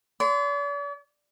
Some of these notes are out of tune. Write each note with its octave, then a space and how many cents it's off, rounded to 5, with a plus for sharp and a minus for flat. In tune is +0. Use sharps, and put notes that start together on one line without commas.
D5 -45 C6 -40